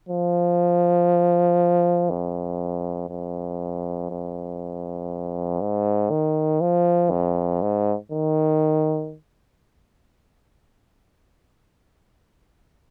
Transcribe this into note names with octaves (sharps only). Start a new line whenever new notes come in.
F3
F2
F2
F2
G#2
D#3
F3
F2
G#2
D#3